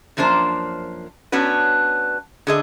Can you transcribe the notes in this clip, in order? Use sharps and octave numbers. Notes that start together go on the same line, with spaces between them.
F#2 F3 A#3 D4 C5
B3 C#4 D4 F#4 B4
D3 G#4 D#5